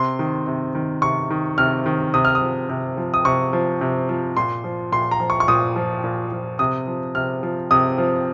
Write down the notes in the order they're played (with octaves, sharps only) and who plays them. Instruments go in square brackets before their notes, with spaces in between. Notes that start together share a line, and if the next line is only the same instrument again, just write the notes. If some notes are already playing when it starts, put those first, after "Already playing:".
Already playing: [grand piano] C3 C6
D#3
C3
D#3
C3 C#6
D#3
C3 F6
D#3
C3 D#6
F6
D#6
F3
C3
F3
D#6
C3 C#6
F3
C3
F3
A#2 C6
F3
A#2 C6
A#5
F3
C#6
C#6
A#2 D#6
F3
A#2
F3
C3 D#6
F3
C3 F6
F3
C3 D#6
F3